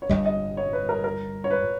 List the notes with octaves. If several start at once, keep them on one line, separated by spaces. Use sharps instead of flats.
C#5
G1 G2 G3 D#5
D#5
C#5
B4
A#4
A#4
C#5
B4